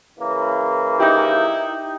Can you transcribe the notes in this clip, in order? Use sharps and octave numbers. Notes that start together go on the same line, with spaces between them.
C#3 E3 A#3
D#4 E4 G4